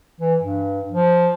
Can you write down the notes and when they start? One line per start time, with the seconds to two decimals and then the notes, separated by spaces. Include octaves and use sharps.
0.21 E3
0.41 G2
0.92 F3